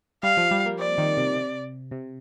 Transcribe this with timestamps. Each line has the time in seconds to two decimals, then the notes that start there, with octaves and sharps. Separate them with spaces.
0.23 G3 F5
0.37 F3
0.51 G3
0.66 A#3
0.79 C4 D5
0.98 D#3
1.17 C3
1.36 C3
1.91 C3